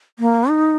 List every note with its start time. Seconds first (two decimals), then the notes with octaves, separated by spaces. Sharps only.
0.19 A#3
0.50 D#4